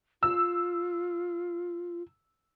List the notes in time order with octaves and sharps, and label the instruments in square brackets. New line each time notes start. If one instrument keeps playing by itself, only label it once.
[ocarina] F4 [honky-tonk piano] E6